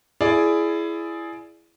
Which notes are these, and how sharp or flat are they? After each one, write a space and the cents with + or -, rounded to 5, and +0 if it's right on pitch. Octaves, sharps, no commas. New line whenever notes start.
E4 +20 G#4 +15 D5 +0